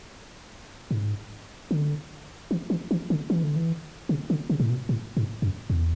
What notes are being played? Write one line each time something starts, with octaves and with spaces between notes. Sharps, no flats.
G#2
D3
E3
E3
E3
D3
E3
D3
E3
C#3
D3
C#3
A2
B2
A2
G#2
F#2
E2